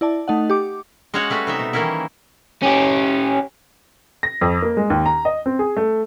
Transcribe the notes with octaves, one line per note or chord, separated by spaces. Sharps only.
E4 D5 A5
A3 D#4 D#5 F#5
G4 D6
G#3 C#4 F#4 C#5 F5 F#5
G3 A3 F#4 B4
C3 D#4 E5
B2
D#3 E3 G3 A#3 C#4 E4
C#4 G4
A#6
F2
A#3
G#3
D#2
A#5
D#5
C4
G#4
A3